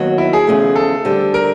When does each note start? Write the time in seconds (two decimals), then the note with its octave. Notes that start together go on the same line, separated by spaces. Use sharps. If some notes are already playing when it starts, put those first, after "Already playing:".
Already playing: D#2 D#3 F#3 B3
0.18 E4
0.33 G#4
0.47 E2 C#3 F3 A3
0.76 A4
1.05 D3 G3 C4
1.34 A#4